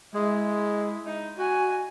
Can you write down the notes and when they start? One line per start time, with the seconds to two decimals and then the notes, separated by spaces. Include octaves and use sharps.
0.14 G#3 E4
1.06 D#4
1.38 F#4 G#5